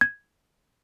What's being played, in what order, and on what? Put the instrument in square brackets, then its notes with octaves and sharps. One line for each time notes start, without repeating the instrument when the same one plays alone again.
[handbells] G#6